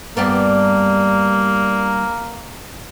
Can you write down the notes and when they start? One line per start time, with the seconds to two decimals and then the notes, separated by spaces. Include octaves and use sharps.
0.17 G2 G3 A#3 B3